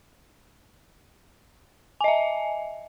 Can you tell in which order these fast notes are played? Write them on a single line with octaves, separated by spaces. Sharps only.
G#5 D#5 E5